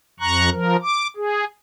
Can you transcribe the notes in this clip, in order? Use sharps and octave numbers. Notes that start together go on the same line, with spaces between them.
F2 A#5 C#6 F#6
F3 A#4
D6
G#4